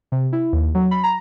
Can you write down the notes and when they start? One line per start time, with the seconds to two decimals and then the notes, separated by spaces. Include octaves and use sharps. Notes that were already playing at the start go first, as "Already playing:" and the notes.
0.12 C3
0.33 E4
0.53 D#2
0.75 F#3
0.91 B5
1.03 A#5